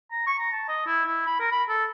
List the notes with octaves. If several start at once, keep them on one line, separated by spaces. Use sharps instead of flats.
A#5
C#6
A#5
A5
D#5
E4
E4
B5
A#4
B5
A4